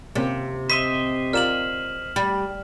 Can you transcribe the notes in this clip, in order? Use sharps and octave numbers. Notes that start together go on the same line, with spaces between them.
C3 A#3 C4 C#4
C5 D#5 E5 B6
F4 A#4 D5 F6 E7 F#7
G3